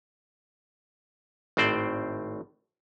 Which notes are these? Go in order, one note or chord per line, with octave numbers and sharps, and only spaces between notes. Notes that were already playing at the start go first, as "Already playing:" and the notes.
G#1 A2 C4 C5 D5